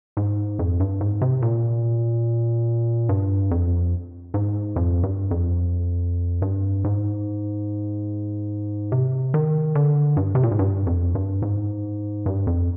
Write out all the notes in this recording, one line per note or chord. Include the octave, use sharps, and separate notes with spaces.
G#2
F2
G2
G#2
C3
A#2
G2
F2
G#2
F2
G2
F2
G2
G#2
C3
D#3
D3
G2
C3
A#2
G#2
G2
F2
G2
G#2
G2
F2